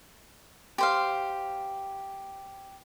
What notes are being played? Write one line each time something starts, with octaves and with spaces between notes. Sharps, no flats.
G4 C5 F5